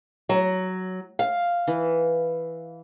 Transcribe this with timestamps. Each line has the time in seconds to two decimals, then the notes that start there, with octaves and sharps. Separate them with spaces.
0.29 F#3
1.19 F5
1.67 E3